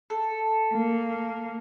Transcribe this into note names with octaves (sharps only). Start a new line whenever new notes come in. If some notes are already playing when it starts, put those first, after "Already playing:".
A4
A#3